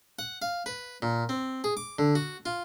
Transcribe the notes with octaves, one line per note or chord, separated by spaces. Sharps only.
F#5
F5
B4
A#2
C4
G#4
D6
D3
F#4
F4